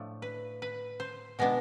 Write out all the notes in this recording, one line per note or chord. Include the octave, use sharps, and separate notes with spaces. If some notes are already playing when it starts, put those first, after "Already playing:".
Already playing: A2 F3 A3 D4
B4
B4
C5
B2 G#3 B3 D4